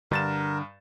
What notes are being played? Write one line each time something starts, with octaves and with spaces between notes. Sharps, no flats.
G2 D3 A#4 A6 E7